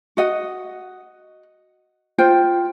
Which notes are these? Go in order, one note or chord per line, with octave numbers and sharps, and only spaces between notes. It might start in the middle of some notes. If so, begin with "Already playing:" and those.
F#4 D#5 F#5
F4 C5 G5